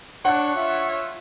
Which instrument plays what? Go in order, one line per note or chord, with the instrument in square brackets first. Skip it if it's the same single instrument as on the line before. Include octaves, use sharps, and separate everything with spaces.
[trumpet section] D4 [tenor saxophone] C#5 [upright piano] F#5 F#6
[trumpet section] F4 E5